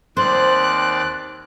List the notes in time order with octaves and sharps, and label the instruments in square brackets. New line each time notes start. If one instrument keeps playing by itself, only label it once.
[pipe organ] D#2 D5 [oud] C4 [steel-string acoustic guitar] C5 [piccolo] F#6